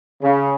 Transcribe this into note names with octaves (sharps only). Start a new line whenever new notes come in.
C#3